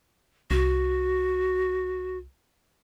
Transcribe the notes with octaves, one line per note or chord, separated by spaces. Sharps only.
C2 F#4